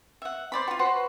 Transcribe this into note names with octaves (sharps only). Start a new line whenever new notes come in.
E5 F#5
C5 D5 B5
F4 F#4
F#4 B4 C5 C6